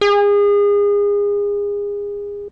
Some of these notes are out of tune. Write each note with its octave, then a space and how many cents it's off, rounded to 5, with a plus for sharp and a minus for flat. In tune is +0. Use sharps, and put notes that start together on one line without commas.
G#4 -30